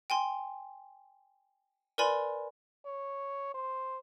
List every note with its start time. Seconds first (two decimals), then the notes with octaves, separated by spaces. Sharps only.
0.10 G5 G#5 C6
1.98 A#4 B4 D5 G#5 B5 C6
2.86 C#5
3.54 C5